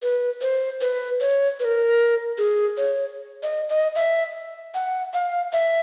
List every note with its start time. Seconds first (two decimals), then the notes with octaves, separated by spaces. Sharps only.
0.02 B4
0.41 C5
0.81 B4
1.20 C#5
1.60 B4
1.64 A#4
2.38 G#4
2.77 C#5
3.43 D#5
3.69 D#5
3.95 E5
4.75 F#5
5.14 F5
5.53 E5